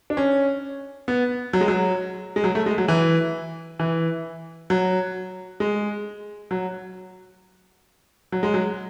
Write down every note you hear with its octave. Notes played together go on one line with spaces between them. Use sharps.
D4
C#4
B3
F#3
G#3
F#3
G#3
F#3
A3
G#3
F#3
E3
E3
F#3
G#3
F#3
F#3
G#3
F#3